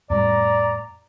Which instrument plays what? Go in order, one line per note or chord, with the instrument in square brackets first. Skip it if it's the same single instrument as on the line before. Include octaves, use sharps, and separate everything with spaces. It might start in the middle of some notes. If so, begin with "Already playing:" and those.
[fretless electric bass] F2 A2 G3 [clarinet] D5 [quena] A#5